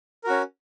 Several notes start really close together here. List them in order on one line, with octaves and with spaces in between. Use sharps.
A#4 F#4 C#4